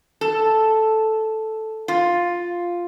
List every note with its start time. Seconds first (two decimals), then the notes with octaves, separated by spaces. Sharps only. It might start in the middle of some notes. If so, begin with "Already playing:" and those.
0.21 A4
1.88 F4